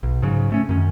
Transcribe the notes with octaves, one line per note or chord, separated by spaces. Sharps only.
B1
G#2 C#3 F#3
G2 A3 C#4
F#2 D#3 C#4